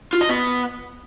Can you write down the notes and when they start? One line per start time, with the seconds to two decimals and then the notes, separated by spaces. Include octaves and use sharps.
0.13 F4
0.21 D#5
0.29 B3